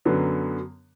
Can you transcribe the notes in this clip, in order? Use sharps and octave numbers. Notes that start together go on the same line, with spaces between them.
F#2 D3 F#3 B3